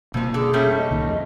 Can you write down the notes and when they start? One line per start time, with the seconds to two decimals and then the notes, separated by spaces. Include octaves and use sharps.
0.14 F1 F2 B2 F3 A#3
0.34 D3 G#4
0.53 G3 A3 C#4
0.77 D#5
0.91 C2 A#2 D#3
1.09 F2